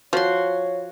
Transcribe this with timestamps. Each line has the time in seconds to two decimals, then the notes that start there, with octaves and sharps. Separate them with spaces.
0.13 F3 F#4 C#5 C6